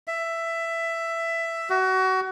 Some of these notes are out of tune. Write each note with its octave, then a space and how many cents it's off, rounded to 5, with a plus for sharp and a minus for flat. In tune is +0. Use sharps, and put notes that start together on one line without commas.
E5 +10
F#4 +25